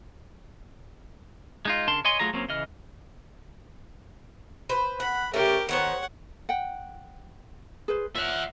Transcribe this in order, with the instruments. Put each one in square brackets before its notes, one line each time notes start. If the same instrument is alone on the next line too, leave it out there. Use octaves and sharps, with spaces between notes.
[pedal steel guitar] G#3 D#4 F4
C#3 D4 A#4 A5 C6
C#5 D#5 G#5 C6
F#3 A3 F4 G#4 A#5
F#3 A#3 C4 C#4
C#3 E3 D#5 F6
[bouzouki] B4 C5
[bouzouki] F#5 [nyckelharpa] B5
[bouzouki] C3 A3 C#4 [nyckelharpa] G4 A#4
[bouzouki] D#3 B3 C5 [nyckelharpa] C#5 F#5
[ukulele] F#5 G5
G#4 B4 C5
[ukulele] F4 C#5 [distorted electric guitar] E5 F#5